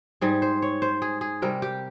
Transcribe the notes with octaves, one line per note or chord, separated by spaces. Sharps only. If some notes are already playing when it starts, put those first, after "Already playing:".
G#2 G3 G#4
C5
C#5
C5
G#4
G#4
C3 G3 A#4
G4